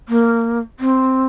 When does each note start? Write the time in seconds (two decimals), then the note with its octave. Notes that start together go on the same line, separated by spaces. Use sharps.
0.09 A#3
0.80 C4